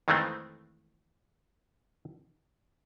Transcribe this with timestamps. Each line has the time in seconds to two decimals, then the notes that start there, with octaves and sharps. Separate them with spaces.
0.08 F2 D#3 E3 G#3 A3 C4